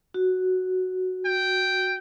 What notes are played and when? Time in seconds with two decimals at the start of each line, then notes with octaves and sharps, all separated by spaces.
0.14 F#4
1.26 G5